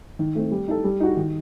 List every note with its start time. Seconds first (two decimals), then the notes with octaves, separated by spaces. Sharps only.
0.19 D#3
0.35 A3 C4
0.51 G3
0.68 D#4 A4
0.84 G3
1.00 D#4 F#4
1.17 D#3